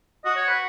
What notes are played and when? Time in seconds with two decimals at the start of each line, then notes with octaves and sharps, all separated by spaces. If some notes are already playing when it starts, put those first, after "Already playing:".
0.25 F#4 D#5
0.36 C#5
0.48 B4